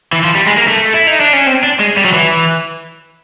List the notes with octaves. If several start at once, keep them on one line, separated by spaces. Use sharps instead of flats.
E3
F3
G3
G#3
A#3
A3
E4
D#4
D4
C#4
C4
D4
G#3
G3
F#3
E3